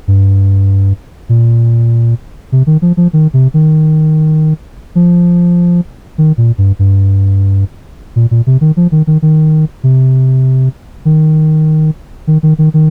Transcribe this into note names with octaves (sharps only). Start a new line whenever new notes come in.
G2
A#2
C3
D#3
F3
F3
D#3
C3
D#3
F3
D#3
A#2
G2
G2
A#2
A#2
C3
D#3
F3
D#3
D#3
D#3
C3
D#3
D#3
D#3
D#3
D#3